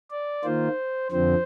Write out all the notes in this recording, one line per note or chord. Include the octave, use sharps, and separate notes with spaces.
D5
D#3 A#3 F4 C5
F2 D3 F3 C4 C5